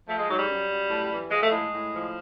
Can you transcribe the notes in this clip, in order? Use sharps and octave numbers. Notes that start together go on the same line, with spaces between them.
F3 A3
G#3
G#2 F#3
G3
F#2
F#2
A2
E3
F3 G#3
A3
A2 G#3
A2
F3